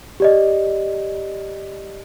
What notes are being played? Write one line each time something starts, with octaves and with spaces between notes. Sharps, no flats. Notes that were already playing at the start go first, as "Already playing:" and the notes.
G4 D5 D#5